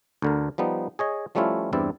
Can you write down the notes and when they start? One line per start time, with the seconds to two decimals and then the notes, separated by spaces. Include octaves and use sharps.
0.22 D2 D3 A#4
0.58 F3 G3 B3 D#4
0.99 G#4 C#5 D#5
1.35 F3 G3 A3 C#4 E4 F4
1.73 E2 G2 C4 E4 D5